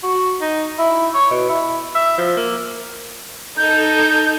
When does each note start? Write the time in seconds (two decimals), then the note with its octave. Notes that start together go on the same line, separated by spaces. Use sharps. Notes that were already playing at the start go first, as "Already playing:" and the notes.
0.03 F#4
0.41 D#4
0.79 E4
1.14 C#5
1.31 B2
1.49 E4
1.95 E5
2.18 F3
2.37 A#3
3.57 D#4 A4 G6